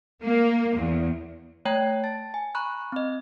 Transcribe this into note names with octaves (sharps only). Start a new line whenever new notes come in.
A#3
E2
A3 C#5 G5 A#5 G#6
A5 A6
G#5
A#5 B5 C#6 F#6
C4 D#5